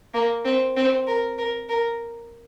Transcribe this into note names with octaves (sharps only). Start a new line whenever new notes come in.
A#3
C4
C4
A#4
A#4
A#4